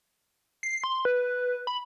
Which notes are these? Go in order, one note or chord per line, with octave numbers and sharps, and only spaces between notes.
C7
C6
B4
B5